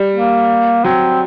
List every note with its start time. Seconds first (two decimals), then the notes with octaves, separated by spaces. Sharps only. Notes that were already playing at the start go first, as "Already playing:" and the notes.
Already playing: G3
0.15 A#3
0.84 F#3 C4